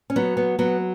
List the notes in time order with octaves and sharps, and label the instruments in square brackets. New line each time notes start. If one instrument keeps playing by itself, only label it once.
[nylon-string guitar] C#4
F#3 B3
B3
F#3 B3